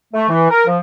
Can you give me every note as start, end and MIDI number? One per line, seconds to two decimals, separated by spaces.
0.14 0.27 57
0.29 0.48 52
0.50 0.65 70
0.67 0.78 53